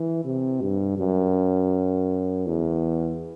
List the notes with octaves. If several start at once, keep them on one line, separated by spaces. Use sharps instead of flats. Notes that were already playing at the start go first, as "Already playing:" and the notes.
Already playing: E3
C3
G2
F#2
E2